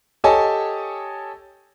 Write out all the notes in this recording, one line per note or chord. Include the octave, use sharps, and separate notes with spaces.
G4 A4 C#5 D#5 G#5 A5